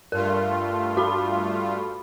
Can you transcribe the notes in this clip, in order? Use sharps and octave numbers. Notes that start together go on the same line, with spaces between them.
G2 A3 F4 A#4
F#4 B5